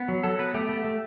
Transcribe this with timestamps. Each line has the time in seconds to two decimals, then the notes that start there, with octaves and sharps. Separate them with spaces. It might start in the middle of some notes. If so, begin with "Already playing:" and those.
Already playing: B3
0.08 F#3
0.23 F#3 A4
0.39 B3 B4
0.54 A3 G4
0.69 A3
0.84 A3